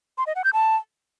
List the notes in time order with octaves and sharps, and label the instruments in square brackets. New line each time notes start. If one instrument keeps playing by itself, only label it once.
[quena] C6
D#5
F#5
G6
A5